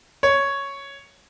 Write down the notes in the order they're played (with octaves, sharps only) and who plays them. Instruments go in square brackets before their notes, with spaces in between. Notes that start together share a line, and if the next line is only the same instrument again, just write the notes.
[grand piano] C#5